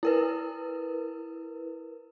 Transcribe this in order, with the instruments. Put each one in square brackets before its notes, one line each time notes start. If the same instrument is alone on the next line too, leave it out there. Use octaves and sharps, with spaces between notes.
[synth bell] E4 A#4 B4